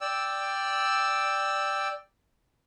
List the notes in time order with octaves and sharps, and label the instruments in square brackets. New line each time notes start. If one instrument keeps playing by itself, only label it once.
[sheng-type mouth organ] D5 G5 E6